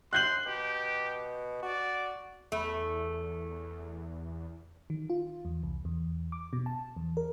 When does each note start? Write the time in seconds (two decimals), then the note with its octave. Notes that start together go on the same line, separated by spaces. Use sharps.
0.13 D#2 C6 F#6 G6 F#7
0.46 B2 G4
1.63 F#4 D5
2.52 E2 A3
4.90 D#3
5.10 F4
5.45 E2
5.63 C2
5.85 E2
6.32 D6
6.53 B2
6.66 A5
6.96 E2
7.17 A#4